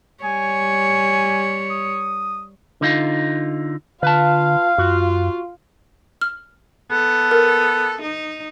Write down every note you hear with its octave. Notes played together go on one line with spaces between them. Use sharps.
G3 C#5 G#5
D#6
D3 D#4 F4
D3 F4 B4 F5 A5
F#2 F4 F#4
F6
B3 A4
A#4
D#4